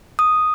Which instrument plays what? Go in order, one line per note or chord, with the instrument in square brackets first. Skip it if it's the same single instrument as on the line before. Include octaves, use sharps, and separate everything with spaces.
[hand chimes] D#6